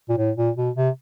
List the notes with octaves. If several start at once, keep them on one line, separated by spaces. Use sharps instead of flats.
A#2
A2
A#2
B2
C3